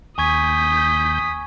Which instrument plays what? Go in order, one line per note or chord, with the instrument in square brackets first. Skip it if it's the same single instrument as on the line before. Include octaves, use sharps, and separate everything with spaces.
[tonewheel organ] D#2 G6 [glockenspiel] G#5 C#6 G#6 [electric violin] D#6 B6